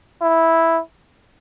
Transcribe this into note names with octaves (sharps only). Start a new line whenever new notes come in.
E4